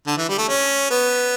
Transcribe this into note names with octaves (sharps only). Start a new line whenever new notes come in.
D3
E3
G3
A3
C#4
B3